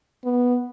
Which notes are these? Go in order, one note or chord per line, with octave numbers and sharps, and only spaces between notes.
B3